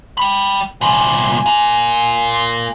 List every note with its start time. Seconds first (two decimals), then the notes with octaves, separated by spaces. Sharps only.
0.18 G5 B5
0.81 C2 A#2 G#5
1.46 F4 A#4